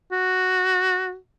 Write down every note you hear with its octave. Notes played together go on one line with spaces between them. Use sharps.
F#4